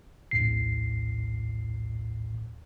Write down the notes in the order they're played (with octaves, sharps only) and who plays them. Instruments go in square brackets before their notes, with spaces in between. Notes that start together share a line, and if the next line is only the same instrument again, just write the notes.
[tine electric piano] A#1 D#2 A2 C7